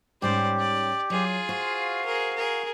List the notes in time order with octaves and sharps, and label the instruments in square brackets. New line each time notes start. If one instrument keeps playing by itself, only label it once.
[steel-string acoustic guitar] G#2 G3 C#4 [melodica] G4 [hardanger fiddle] C5 D5
[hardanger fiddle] D5
[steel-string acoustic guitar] F#3 [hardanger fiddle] F4 G#4
[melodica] F#4 F5 [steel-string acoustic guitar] C5
[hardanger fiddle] G#4 A#4
G#4 A#4